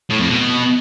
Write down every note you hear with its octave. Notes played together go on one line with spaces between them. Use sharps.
A2
F2
B2